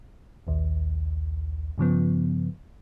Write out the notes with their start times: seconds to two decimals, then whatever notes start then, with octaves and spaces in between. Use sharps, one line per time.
0.47 A#1 D#2
1.78 G2 C#3 F3 B3